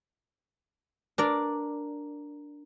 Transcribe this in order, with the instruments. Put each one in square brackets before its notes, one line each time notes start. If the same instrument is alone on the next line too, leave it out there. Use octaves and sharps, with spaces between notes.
[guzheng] D4 A#4 D5